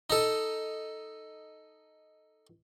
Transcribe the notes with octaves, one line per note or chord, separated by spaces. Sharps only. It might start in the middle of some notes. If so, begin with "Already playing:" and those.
D#4 A4